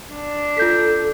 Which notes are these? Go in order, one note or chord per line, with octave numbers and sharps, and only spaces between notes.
D4
F4 A4 G6 B6